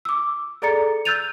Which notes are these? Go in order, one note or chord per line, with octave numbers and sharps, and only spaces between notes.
D6 E6
G#4 A4 D5 A#5 A6 C#7
E6 F#6 G6 A6 D#7 F7